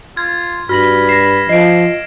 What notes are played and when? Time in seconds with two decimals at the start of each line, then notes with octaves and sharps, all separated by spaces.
0.17 F4 G#6
0.69 G2 F#4 B5 F6 A#6 F#7
1.09 A#6 C7 E7
1.49 F3 D#5 C7 D7